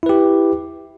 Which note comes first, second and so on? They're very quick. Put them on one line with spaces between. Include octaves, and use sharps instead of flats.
E4 B4 G4